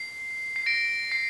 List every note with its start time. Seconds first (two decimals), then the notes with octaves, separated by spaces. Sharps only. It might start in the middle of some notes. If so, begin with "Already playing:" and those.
Already playing: C7
0.56 C7
0.66 A#6 D7
1.12 C7